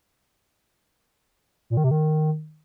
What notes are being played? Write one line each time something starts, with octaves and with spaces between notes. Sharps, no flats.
A#2
D#3
C3
D#3